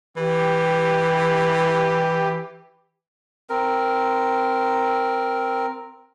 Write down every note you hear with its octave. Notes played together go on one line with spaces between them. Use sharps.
E3 G4
C4 A#4